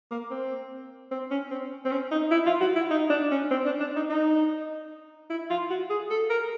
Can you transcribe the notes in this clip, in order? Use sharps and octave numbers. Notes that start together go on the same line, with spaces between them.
A#3
C4
C4
C#4
C4
C4
C#4
D#4
E4
F4
F#4
E4
D#4
D4
C#4
C4
D4
D4
D#4
D#4
E4
F4
F#4
G#4
A4
A#4